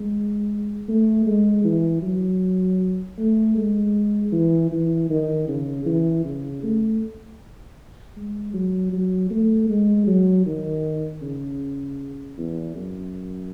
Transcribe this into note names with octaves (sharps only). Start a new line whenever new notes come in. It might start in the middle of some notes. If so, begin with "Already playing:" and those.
Already playing: G#3
A3
G#3
E3
F#3
A3
G#3
E3
E3
D#3
C#3
E3
C#3
A3
G#3
F#3
F#3
A3
G#3
F#3
D#3
C#3
E2
F#2